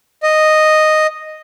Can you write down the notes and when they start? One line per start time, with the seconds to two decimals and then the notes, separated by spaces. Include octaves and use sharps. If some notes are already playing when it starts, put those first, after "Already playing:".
0.23 D#5